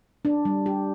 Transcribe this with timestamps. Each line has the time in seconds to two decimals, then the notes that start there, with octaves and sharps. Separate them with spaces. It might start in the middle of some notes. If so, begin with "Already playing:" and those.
0.25 D4
0.45 G3
0.66 G4